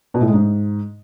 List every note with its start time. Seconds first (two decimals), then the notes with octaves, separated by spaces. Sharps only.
0.14 B2
0.21 A2
0.27 G#3
0.34 G#2